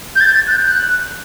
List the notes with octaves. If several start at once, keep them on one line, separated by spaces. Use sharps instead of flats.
G6
A6
A6
F#6
G6
G6
F#6